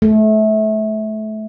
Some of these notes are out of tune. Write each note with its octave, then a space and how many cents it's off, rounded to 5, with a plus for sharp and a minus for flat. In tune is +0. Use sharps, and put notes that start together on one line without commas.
A3 -25